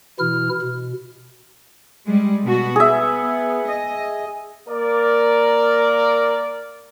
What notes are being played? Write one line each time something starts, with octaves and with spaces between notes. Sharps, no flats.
B2 E3 E4 F6
B2
G3 G#3
B2 B3 F#4
B3 G#4 E5
D#5
A#3 A#4 D5